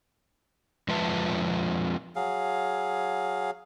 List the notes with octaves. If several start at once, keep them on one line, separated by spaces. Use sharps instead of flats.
F2 F3 G#3 B4 E5 A5
F#3 G#4 F5